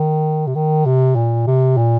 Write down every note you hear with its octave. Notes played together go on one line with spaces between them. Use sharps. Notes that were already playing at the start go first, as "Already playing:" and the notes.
Already playing: D#3
C3
D#3
C3
A#2
C3
A#2